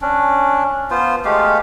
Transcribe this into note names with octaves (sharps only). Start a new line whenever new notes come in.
C#4 D4
B3 F4 C5
G#3 A3 G4 F5